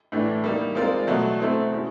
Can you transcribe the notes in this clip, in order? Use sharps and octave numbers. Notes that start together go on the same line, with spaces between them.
A2 E3 A3 D4
G3 A#3 D#4
G#3 C4 F4 A#4 D5
B2 F#3 A3
A3 C4 E4 A4
B2 G#3 C#4 E4